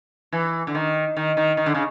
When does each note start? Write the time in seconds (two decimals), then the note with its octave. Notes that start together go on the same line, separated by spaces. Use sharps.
0.32 E3
0.67 D3
0.75 D#3
1.17 D#3
1.37 D#3
1.57 D#3
1.66 D3
1.74 C#3